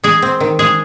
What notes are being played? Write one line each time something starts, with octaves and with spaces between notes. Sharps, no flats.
G#3 G#4
C4
D#3
G#3 G#4